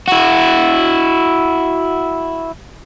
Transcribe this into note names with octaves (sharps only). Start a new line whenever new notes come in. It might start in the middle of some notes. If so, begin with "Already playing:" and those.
E4 F#4